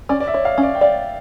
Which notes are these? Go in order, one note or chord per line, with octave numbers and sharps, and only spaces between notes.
C#4 D5
D5
E5
C#5
F5
C#4
D5
G5
D5 F5